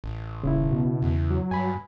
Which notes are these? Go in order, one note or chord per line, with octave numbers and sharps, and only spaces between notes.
A1
D#1 C#3 E4
B2
E2
F#3
G2 G#5 B5